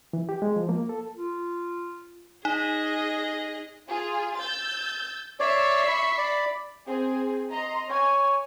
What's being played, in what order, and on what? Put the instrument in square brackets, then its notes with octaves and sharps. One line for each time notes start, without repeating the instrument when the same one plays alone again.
[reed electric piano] E3
G4
G#3
F3
A#3
A4
[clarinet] F4
[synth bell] D#4 [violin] G#4 D#5
[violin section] F4 G#4
E6 G6 A6
[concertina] C#5 D5 [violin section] E5 C7 C#7
[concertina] B5 C#6
D5 B5
[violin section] C4 G#4
D#5 A#5 C6
[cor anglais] C#5 [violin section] G#5